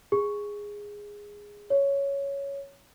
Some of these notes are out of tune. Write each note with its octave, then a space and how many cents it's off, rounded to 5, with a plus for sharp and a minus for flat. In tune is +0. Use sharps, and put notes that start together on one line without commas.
G#4 -10
C#5 +5